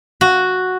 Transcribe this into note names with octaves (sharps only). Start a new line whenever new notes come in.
F#4